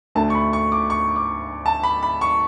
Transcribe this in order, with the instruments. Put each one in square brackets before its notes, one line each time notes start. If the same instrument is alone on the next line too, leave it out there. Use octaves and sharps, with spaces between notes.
[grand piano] D2 D3 A3 A5
C#6
B5
C#6
D6
C#6
D6
A5
B5
B5
C#6